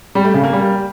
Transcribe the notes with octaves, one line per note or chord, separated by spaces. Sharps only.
G3
A3
C#3
A#3
G3